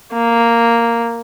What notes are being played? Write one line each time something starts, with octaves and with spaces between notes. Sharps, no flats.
A#3